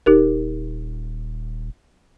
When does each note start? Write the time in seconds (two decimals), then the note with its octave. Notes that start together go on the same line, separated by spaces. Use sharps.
0.06 D#1 D#4 G4 A#4